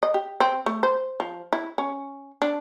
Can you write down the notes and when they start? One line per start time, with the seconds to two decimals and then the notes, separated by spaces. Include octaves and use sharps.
0.03 D#5
0.14 G4
0.40 C4
0.66 A3
0.83 C5
1.20 F3
1.53 E4
1.78 C#4
2.42 D4